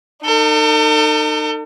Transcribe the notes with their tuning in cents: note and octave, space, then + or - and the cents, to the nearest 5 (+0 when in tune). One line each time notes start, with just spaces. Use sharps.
D#4 -25 A4 +45